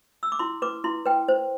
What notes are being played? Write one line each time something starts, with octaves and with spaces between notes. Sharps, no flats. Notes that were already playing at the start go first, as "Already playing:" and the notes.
E6
D6
E4 C6
B4 D6
E4 C6
B4 G5
C5